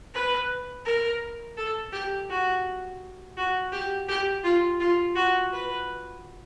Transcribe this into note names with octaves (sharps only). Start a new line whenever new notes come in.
B4
A#4
A4
G4
F#4
F#4
G4
G4
F4
F4
F#4
B4